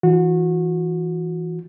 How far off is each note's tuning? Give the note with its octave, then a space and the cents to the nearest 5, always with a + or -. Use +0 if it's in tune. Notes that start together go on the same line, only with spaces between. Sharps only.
E3 -5 F#4 -30